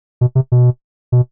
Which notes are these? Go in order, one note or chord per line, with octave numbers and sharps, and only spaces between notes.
B2
C3
B2
B2